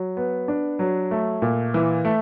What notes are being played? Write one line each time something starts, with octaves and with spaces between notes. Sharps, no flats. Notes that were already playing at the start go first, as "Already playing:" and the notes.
Already playing: F#3
B3
D4
F#3
A3
A#2
E3
A3